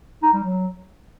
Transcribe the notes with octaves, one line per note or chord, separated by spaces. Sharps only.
D#4
G3
F#3